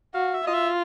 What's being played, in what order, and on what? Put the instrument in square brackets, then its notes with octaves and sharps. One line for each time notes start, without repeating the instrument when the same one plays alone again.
[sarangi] F#4 [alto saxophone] F5
[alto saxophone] E5
[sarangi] F4 [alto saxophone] D#5
[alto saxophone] E5